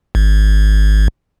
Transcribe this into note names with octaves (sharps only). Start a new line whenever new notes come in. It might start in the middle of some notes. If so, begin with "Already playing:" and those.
G#1